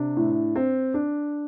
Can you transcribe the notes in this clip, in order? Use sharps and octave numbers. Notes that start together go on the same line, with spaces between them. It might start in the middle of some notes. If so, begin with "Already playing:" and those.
Already playing: C3 D4
A2
C4
D4